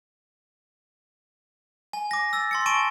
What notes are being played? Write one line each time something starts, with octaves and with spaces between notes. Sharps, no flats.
G#5
D6 A#6
E6 A6
C6 A6 C#7
G#5 A5 C#6 D7 E7